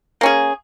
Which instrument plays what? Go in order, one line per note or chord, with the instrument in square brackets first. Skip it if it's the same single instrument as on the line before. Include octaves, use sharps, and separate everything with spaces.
[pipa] A#3 C#4 G#4